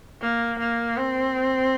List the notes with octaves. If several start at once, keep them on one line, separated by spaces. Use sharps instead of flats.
A#3
A#3
C4